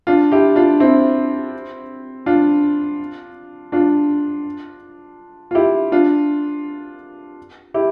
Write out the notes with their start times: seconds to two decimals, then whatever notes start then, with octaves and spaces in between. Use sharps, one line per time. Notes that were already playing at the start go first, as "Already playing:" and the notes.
0.07 D4 F4
0.32 E4 G4
0.56 D4 F4
0.80 C4 E4
2.26 D4 F4
3.72 D4 F4
5.51 F4
5.55 E4 G4
5.92 D4 F4
7.74 E4 G4